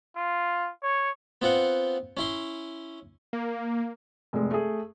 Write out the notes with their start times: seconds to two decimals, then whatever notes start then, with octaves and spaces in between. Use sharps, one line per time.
0.16 F4
0.83 C#5
1.42 B3 C4 F4 C5 F#5
2.17 C#4 E4 C6
3.33 A#3
4.33 F1 G#3
4.51 A3 G#4